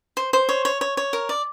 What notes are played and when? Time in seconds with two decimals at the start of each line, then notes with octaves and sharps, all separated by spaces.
0.17 C5
0.33 C5
0.49 C#5
0.65 C#5
0.81 C#5
0.97 C#5
1.13 A#4
1.29 D5